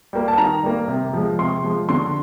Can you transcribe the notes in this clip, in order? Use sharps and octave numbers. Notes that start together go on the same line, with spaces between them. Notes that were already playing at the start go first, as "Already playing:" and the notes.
G3 A#3
A5
D#3 A#5
G3 A#3
C3
F3 G#3
C3 C6
F3 G#3
D3 C6